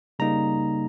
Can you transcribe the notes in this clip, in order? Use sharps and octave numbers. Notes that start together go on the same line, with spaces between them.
C#3 G3 A#3 D#4 A#5